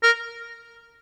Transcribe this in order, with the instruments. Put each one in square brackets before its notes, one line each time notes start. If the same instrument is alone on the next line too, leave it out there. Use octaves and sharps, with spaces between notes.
[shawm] A#4